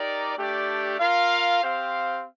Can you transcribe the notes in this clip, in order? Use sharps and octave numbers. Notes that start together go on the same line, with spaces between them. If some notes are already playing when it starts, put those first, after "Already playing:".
Already playing: D#4 G4 A#4 D5
A3 D4 G4 D5
F4 A#4 F5
C4 G4 C5 F5